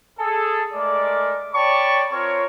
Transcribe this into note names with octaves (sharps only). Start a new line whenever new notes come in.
G#4 A4
G#3 A3 A#4 D5
C#5 D5 G5 A5 B5 C#6
C4 F4 A#4 C#5